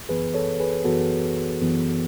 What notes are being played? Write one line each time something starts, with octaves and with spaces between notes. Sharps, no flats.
F#2 E3 B3 G#4 B4
A4 C#5
G#4 B4
F#2 E3 B3 F#4 A4
F#2 E3 B3